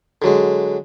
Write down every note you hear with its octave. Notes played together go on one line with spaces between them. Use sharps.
D3 F#3 G#3